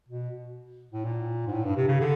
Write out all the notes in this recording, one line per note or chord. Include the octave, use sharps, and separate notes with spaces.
B2
A2
A#2
G#2
A2
G2
C3
C#3
D3